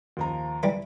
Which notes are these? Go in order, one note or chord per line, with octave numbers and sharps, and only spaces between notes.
D#2 F3 A#5
E3 G3